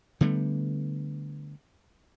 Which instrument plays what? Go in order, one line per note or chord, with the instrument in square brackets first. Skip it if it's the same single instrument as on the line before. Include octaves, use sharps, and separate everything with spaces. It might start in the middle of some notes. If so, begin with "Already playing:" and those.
[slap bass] D3 G3 A3 B3